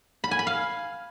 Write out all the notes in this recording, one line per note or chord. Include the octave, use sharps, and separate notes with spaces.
B5
G#5
B5
F5